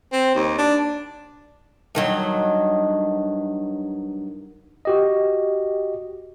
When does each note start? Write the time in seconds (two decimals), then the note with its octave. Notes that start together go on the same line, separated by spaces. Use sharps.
0.12 C4
0.35 D#2
0.58 D4
1.95 G2 D#3 F#3
4.85 F#4 G4 D#5